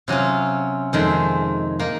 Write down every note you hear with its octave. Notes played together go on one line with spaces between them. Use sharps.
C3 F#3 C#4 F4
F2 D#3 G#3 C4
D#3 A#3